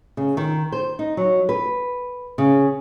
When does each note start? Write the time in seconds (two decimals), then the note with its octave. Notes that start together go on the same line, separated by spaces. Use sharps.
0.17 C#3
0.37 D#3
0.72 C5
0.99 D#4
1.17 F#3
1.49 B4
2.38 C#3